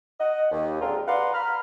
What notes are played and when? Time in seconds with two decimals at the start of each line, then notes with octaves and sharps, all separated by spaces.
0.20 D#5 F#5
0.52 D#2
0.81 A#2 D3 G#3 C4 F4 A#4
1.07 B4 D5 F5 F#5 A#5 C6
1.33 A#5 B5 F6